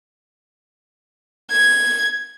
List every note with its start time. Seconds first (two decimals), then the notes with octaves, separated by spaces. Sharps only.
1.51 G#6